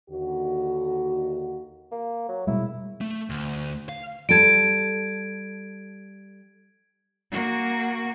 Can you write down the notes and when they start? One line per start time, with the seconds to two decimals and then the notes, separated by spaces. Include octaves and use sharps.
0.10 D#2 D3 F#4
1.92 A#3
2.28 F#3
2.47 B2 G3 G#3 E4
3.01 A3
3.30 D2
3.89 F5
4.29 G3 A4 G#6 D7
7.31 A#3 F#4